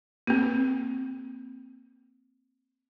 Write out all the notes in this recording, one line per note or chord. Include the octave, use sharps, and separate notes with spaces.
A#3 C4